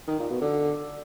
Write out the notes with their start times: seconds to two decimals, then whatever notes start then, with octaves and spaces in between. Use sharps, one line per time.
0.08 D#3
0.19 A#2
0.30 B2
0.41 D3